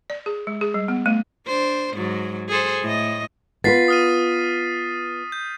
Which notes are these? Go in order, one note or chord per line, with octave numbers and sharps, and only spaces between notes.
D5
G#4
G#3
G#4
G3
B3
A3
D4 C5
G#2 F#3
G#4 A4 C5
A2 A3 D#5
B3 F4 B4 A6 B6 C7
D#6 F6 D#7
G6